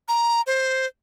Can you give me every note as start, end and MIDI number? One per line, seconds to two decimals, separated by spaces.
0.08 0.41 82
0.47 0.86 72